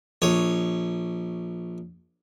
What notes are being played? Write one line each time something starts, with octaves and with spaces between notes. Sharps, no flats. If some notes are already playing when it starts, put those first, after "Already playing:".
A#1 C#5 D#6